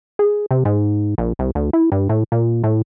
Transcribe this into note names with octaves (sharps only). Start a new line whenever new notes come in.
G#4
C3
G#2
A#1
C2
D2
E4
G2
A2
A#2
A2